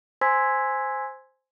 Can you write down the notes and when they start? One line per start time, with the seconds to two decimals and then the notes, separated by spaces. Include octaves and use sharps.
0.21 C5 G#5 C6 E6 G#6 B6